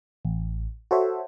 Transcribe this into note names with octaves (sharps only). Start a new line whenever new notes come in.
A1
F#4 A4 C5 C#5 E5